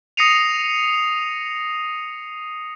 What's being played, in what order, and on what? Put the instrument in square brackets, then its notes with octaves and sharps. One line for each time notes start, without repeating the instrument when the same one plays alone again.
[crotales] D#6 A#6 C7 C#7 D#7 F7